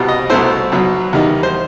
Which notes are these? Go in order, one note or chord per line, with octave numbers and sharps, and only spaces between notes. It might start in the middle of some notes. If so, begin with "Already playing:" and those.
Already playing: C2 B2 G3
D#5
C2 B2 A3 E4 C5
B1 B2 F#3
E2 D#3 G3 D#4
C5